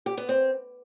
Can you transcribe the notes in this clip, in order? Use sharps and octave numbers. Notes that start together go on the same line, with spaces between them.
G4
B3
C4